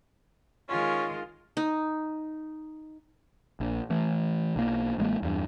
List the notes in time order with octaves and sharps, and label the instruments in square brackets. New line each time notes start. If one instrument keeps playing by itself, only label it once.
[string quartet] D#3 G#3 F4 [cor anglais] C#4
[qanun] D#4
[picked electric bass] A#1
E3 A3
B1 A#3
A1 G#3 A#3
E2 G2